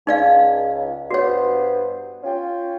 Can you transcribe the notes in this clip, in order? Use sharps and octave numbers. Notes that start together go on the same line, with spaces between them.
C#2 D#4 D5 F5
G2 B3 F#4 C5 C#5
C#4 F4 G5